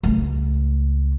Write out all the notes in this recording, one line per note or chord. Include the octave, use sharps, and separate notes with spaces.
C#2 A3